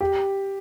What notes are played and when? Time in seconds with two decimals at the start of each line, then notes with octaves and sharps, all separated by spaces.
0.01 G4